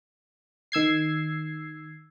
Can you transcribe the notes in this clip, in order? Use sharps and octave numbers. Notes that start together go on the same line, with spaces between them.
D#3 E6 G#6 C7